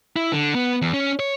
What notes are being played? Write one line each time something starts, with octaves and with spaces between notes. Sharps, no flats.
E4
D3
B3
E2
C#4
C#5